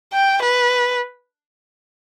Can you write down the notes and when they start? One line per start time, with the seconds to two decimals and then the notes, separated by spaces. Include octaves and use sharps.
0.13 G5
0.42 B4